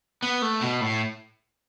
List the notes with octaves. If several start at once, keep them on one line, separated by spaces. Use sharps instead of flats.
B3
A3
B2
A2